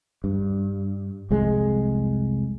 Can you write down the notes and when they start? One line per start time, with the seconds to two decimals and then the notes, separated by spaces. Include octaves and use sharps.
0.24 G2
1.30 C2 F2 G#3